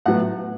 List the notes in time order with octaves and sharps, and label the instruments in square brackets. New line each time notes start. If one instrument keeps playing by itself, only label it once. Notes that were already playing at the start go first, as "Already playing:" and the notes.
[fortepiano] A2 F#3 B3 F#5